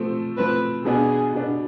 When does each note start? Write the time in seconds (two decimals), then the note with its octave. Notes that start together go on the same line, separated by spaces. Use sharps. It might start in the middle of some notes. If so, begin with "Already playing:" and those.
Already playing: F3 A3 C4
0.37 F3 A3 C4 B4
0.85 B2 B3 D4 G#4
1.33 B2 B3 D4